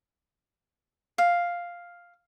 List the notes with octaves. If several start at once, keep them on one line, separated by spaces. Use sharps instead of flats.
F5